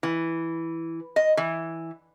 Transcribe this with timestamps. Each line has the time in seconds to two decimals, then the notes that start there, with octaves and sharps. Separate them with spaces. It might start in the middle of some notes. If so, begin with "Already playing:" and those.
0.03 E3
1.16 D#5
1.37 E3